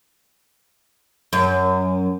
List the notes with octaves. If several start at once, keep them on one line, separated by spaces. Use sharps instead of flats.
F#2